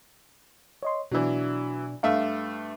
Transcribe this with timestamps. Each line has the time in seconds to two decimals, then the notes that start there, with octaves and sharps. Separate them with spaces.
0.83 C#5 D#5 C6
1.12 B2 E3 F#3 D4 D5
2.03 G2 A3 E5 F5